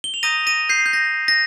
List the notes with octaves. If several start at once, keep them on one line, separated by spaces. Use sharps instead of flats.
G7
F7
A#5 D#6 G6 A#6 D#7
A#6 D#7
G6 C7
G6
A#6
A#6